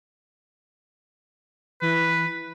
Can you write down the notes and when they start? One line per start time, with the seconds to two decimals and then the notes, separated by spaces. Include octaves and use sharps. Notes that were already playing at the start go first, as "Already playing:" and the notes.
1.82 E3 B4